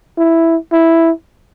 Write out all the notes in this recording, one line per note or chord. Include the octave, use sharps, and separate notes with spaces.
E4
E4